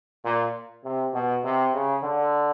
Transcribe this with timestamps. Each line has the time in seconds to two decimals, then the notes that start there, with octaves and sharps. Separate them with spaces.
0.24 A#2
0.84 C3
1.14 B2
1.44 C3
1.74 C#3
2.03 D3